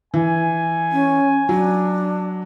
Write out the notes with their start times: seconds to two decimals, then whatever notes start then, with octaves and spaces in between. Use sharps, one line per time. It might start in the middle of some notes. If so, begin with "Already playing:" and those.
0.14 E3 G#5
0.92 C#4
1.49 F#3 D4